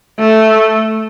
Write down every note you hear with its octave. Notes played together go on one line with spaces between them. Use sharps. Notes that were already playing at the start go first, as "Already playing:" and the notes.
A3